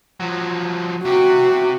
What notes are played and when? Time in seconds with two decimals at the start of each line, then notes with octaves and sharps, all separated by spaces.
0.20 F3 F#3
1.05 C3 F#4 G4